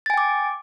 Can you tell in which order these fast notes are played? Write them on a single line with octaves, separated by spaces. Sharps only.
A6 G#5 G5 D6